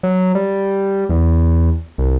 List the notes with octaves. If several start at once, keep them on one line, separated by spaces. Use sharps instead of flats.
F#3
G3
E2
C2